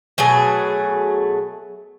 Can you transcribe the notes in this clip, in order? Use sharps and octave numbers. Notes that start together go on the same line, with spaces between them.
B2 F#3 A3 G#4